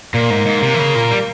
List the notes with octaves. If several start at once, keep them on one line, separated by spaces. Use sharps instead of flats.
A#2 A#3
G#2
G#2
C3
E3
C#3
A#2
G3